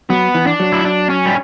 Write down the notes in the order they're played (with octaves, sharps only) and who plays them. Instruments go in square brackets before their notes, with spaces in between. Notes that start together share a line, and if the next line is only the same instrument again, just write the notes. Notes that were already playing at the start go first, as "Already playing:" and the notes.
[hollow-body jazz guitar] F#3 [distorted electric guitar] B3
[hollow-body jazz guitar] E3
[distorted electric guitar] D4
[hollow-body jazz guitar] F#3
[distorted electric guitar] E4
D4
C#4
G3